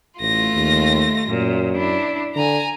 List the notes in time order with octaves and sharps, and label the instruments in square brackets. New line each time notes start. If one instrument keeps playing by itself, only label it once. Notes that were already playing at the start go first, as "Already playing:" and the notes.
[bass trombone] A1 [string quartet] A3 F4 A#6
[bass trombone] D#2
[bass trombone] F#2 [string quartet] A#2
[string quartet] D4 E4
[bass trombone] D3 [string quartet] G#5 A#5